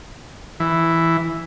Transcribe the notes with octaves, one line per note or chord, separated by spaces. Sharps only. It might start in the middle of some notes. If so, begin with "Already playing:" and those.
E3